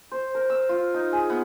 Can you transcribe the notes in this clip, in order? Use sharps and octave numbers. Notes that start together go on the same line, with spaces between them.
C5
A#4
E6
F4
D#4
G#4
B3